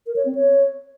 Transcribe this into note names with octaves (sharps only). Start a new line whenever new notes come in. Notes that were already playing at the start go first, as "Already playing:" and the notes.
A#4
C#5
C4
C#5